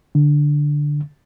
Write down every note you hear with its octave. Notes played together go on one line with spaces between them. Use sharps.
D3